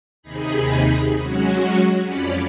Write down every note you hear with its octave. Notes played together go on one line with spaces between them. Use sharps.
D#2 C3 D#4 G#4 B5
F#3 G#3 C#4 F#4
F2 F3 C#4 C#5 D5 B5